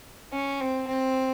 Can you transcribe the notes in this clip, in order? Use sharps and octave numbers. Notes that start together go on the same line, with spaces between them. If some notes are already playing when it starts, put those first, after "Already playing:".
C#4
C4
C4